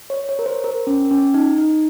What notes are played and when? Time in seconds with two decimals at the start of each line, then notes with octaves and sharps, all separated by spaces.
0.10 C#5
0.29 C#5
0.39 A#4
0.46 C5
0.64 A#4
0.87 C#4
1.11 C#4
1.34 D#4
1.58 D#4